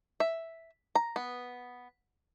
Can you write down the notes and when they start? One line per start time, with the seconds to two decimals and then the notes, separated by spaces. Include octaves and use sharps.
0.20 E5
0.95 A#5
1.16 B3